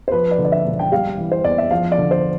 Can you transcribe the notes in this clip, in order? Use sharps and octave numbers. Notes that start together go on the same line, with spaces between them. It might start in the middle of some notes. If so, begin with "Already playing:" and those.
C5
F3 B4
D5
D3
D5
E5
E1
G5
G3 F5
E3
C5
E2 D5
E5
F3 F5
D5
D3
C5